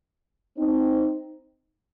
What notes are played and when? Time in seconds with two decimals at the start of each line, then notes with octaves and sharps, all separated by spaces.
0.57 C4 D#4